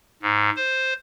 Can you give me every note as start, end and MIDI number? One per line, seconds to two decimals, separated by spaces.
0.22 0.50 44
0.56 0.93 72